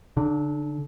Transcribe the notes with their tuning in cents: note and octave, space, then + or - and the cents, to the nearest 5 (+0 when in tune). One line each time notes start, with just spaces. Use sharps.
D3 -30 D4 +40